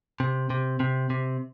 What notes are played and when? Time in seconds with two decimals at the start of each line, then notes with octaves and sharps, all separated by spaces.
0.20 C3
0.50 C3
0.80 C3
1.10 C3